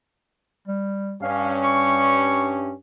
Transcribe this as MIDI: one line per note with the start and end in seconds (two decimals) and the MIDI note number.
0.68 1.16 55
1.22 2.74 43
1.22 2.74 61
1.22 1.52 77
1.64 2.64 85